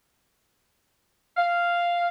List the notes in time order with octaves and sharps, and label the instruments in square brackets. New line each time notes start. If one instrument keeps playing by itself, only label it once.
[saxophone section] F5